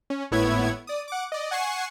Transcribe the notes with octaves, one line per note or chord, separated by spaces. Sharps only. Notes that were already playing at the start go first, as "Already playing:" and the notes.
C#4
G#1 A2 B3 E4 C#5 G#6
D5 D#6
F#5 D6
D5 D#5
F#5 G#5 C#6 C7 E7